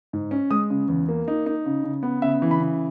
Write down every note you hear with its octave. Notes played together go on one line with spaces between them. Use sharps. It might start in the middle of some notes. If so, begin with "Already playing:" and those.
G#2
C#4
G#3 D#6
C#3
E2
A#3
D#4
D#4
C#3
C#3
B3
C#3 E5
E3
B5
C#3